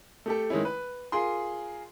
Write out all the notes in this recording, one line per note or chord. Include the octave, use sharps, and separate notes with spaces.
A3 G4 A4
D#3 G#3 A3 C#4 E4
B4
F4 G#4 A#4 C6